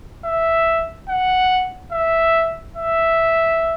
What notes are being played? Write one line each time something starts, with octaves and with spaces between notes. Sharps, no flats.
E5
F#5
E5
E5